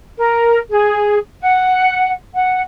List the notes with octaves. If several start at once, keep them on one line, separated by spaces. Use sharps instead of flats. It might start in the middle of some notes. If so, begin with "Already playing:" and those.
A#4
G#4
F#5
F#5